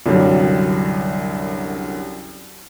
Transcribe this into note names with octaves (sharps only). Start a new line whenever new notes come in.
C2 F#2 D3 F#3 G3